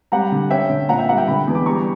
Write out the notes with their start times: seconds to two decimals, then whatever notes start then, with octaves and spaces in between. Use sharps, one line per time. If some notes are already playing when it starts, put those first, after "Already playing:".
0.12 G3 F#5 A#5
0.32 D3
0.50 C#4 E5 G5
0.69 D3
0.89 A#2 F#5 A#5
0.99 E5 G5
1.09 G3 F#5 A#5
1.18 E5 G5
1.28 D3 G5 B5
1.47 E2
1.55 D6
1.66 G3 A#5 C#6